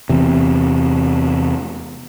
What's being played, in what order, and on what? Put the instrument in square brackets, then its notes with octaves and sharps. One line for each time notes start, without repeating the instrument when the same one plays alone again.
[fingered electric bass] E2 C3